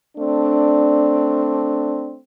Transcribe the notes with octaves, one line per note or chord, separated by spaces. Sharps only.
A3 C4 D4